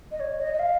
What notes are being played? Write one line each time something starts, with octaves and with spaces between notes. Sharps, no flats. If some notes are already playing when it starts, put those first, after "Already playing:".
D#5
C#5
D#5
D#5
F5